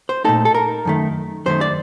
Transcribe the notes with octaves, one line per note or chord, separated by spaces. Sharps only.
C5
A#2 A3 D#4 A4
A4
A#4
F#2 D#3 A3
F#2 D#3 A3 C5
D5